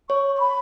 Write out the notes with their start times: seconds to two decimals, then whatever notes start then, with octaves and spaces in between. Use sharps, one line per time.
0.10 C#5 C#6
0.36 C#6
0.40 B5